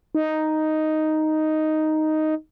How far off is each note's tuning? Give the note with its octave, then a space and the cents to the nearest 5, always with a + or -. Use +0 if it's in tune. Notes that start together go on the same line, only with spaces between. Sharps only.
D#4 +0